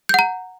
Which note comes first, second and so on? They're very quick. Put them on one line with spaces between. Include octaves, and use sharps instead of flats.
G6 F#5 A#5